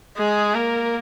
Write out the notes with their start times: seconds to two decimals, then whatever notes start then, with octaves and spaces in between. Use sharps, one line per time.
0.18 G#3 G#4
0.55 A#3 A#4